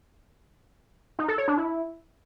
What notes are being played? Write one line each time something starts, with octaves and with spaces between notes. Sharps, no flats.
D#4
A4
C#5
D4
E4